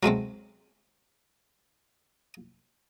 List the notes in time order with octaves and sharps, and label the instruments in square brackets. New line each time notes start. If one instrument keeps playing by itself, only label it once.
[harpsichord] F#3 G#3 A3 C4